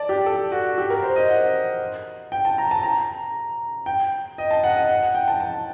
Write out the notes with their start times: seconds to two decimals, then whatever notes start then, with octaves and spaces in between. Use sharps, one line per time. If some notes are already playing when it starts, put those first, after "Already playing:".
Already playing: D5 A5
0.09 G4
0.26 A4
0.52 F#4
0.78 G4
0.90 A#4
1.03 C5
1.16 D#5
1.29 F#5
2.32 G5
2.45 A5
2.58 A#5
2.71 A5
2.83 A#5
3.86 G5
4.38 D#5
4.51 A5
4.64 F#5
4.76 D#5
4.89 F#5
5.03 F#5
5.15 G5
5.28 A5
5.40 A5